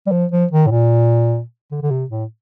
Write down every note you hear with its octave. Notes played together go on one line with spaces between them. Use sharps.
G3
F3
F3
D#3
A2
A#2
D3
D3
C3
A2